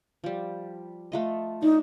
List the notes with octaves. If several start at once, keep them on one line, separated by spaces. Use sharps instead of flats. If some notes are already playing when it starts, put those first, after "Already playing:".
F3 G3
A3 F4 D#5
D4 D#4